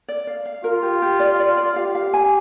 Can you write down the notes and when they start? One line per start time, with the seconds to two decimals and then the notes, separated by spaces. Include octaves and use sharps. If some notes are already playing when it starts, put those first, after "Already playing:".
0.08 D5
0.27 F5
0.46 F5
0.64 F4 A#4
0.83 G4
1.02 G4
1.20 D5
1.39 D5
1.57 D5
1.76 G4 F5
1.95 F5
2.14 G#5